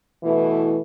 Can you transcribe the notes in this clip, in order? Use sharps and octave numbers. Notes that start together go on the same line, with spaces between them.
B2 E3 A3 E4